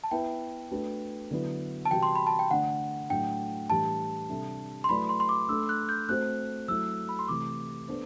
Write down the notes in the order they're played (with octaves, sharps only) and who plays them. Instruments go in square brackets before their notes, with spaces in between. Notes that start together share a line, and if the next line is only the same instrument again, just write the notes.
[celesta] A5
[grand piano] B3 E4 B4 E5 [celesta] G5
[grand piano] A3 D4 F#4 B4
D3 F#3 B3 E4 B4
[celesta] A5
[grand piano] C3 E3 G3 C4 F#4 [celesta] G5
[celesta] C6
B5
A5
G5
[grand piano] D3 A3 D4 [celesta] F#5
[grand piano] A2 F#3 A3 D4 A4 [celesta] G5
[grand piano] A2 E3 G3 D4 G4 [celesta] A5
[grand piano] C3 G3 D4 A4 E5
[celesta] C6
[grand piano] F#3 A3 E4 B4 D5 [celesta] B5
[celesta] C6
C6
D6
[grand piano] A3 D4 A4 [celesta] E6
[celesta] F#6
G6
[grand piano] A3 C4 F#4 C5 [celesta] F#6
[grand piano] F#3 A3 E4 [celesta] E6
[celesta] B5
C6
[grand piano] C3 E3 A3 [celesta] D6
[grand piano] B3 D4 A4 C5